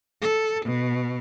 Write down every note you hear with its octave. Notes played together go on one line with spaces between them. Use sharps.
A4
B2